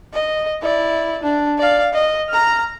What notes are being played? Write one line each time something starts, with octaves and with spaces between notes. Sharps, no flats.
D#5
E4 D5
D4
D5 F5
D#5
A#5 F6